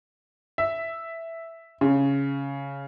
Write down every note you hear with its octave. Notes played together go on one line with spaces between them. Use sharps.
E5
C#3